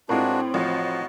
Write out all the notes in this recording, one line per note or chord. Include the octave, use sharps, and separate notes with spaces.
A2 G#3 C4 D4 F4 F#4 A#4
A1 F3 F#4 D#5